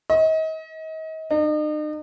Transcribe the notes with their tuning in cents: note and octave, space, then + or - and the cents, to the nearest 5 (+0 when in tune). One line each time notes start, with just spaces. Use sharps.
D#5 +35
D#4 -40